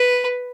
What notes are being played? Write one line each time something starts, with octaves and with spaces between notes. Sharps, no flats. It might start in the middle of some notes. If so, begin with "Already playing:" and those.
Already playing: B4